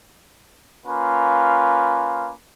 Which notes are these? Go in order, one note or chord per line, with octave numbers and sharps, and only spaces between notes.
A#3 C#4 F4 B4